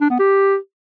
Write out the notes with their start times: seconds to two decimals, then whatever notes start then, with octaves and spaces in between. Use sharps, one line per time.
0.01 D4
0.10 B3
0.19 G4